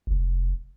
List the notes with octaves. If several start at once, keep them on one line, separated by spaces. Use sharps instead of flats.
F1